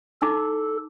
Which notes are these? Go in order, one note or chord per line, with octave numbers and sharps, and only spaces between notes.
D#4 E4 A4 D6